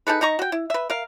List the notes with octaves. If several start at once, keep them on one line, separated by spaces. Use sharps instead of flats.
D#4 G#4 A4 B4
D#4 D#5 A#5 C#6
F#4 G5
E4
B4 E5
A#4 F5